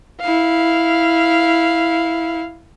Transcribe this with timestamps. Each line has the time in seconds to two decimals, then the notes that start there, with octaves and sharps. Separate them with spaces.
0.21 E4 F5